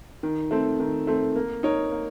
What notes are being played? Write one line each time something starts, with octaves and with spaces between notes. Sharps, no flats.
D#3
A3 C4
D#3
A3 C4
A#3
D#4 A#4 C#5
A#3